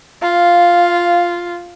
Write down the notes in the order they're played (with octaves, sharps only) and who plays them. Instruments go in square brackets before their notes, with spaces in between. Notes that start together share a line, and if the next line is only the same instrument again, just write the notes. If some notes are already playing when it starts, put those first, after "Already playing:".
[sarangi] F4 [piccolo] F5